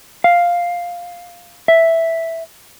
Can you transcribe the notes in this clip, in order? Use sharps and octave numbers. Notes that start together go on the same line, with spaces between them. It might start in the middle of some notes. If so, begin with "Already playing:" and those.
F5
E5